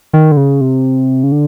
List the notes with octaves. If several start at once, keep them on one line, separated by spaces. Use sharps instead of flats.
D#3
D3
C#3
C3
C#3
D3